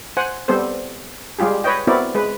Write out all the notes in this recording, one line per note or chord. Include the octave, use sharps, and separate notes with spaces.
C5 F#5 G#5
G3 B3 C4 A4 C5
G3 G#3 F4 G4 G#4
B4 C#5 D#5 G5
B3 C4 E4 F#4 A#4 D5
G#3 B4